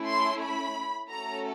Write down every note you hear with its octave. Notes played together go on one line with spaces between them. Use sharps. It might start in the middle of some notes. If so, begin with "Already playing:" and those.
Already playing: A3 C#4 E4
C6
B5
A3 C#4 F#4 A4 A#5